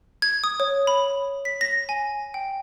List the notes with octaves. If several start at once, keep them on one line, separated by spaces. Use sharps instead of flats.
G#6
D#6
C#5
B5
B6
A#6
G#5
G5